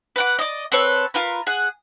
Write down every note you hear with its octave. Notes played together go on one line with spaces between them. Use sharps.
B4 F#5 D6
D5 D#5
C4 A4 B4 C#5
F4 A#4 B4
G#4 F#5